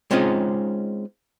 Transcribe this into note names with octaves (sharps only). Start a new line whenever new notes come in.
G#3 C4 C#4 D#4 F4 D#5